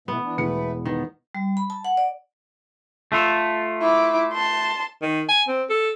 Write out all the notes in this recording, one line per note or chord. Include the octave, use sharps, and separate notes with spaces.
B2 E3 A3 B3
E3 D4
E1 E3 A3 B4 C#7
D#3 B3
G3
B5
A5
F#5
D5
A3 F4 A4
E4 D6
A5 C6
D#3
G#5
C4
A4